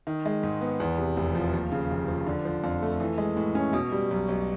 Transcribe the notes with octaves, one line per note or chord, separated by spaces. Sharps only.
D#3
G#3
G#2
B3
E2
C3
F1
F3
D#2
C#3
F1
F3
D3
F3
F2
A3
E3
G#3
A2
C#4
B2
G3
B1
B1